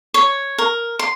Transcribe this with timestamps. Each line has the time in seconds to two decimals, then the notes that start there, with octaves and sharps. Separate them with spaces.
0.14 C#5
0.58 A#4
0.99 C6